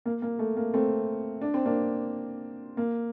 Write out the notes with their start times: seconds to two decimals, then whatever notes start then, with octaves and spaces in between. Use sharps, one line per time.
0.06 A#3
0.22 A#3
0.39 A3
0.57 A#3
0.74 A3 C4
1.41 D4
1.54 C4
1.65 A#3 D4
2.77 A#3